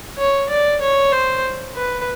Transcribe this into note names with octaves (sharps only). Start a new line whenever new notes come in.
C#5
D5
C#5
C5
B4